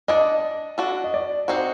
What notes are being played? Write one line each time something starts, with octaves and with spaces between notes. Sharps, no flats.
D4 A4 D5 D#5
D4 F#4 A4
D#5
D5
C4 D#4 F#4 C5